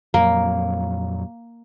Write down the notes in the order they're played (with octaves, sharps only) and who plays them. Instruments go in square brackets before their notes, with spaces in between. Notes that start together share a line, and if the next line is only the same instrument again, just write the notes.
[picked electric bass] F2 A#2 F#3 [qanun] A#3